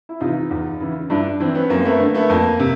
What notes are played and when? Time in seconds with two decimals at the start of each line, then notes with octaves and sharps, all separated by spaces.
0.09 E4
0.20 C3 E3 D#4 F4
0.51 E2
0.80 C#3 E3
1.10 G2 D4 E4
1.40 E3 C4 D4
1.55 B3 C#4
1.70 F#2 A#3 C4
1.85 A3 B3
2.00 D3 A#3
2.15 A3 B3
2.30 F2 A#3
2.59 C3